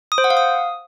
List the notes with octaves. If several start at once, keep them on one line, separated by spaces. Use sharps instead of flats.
D#6
C5
F#5
F5
D#6